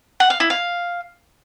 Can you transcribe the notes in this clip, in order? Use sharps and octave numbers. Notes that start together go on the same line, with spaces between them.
F#5
F5
E4
F5